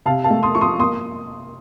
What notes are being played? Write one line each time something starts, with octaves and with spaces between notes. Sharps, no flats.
C3 F5 A5
F5 A5
A3
C6 D#6
F3 C#6
C6 D#6
A#3 C6 D#6